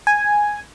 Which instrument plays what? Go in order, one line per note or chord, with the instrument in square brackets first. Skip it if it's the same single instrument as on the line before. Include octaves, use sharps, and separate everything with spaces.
[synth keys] G#5